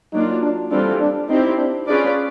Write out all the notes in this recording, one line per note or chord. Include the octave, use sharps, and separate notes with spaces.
F#3 A#3 D4 D#4 F4
D4
E3 G3 C4 D4 F4 A4
D4
C4 D#4 E4 G4
D4
C#4 D4 F4 G#4 B4 D5